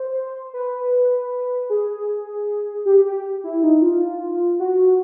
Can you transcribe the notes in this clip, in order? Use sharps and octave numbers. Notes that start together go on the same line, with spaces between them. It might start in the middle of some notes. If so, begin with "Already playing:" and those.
Already playing: C5
B4
G#4
G4
G4
E4
D#4
F4
F#4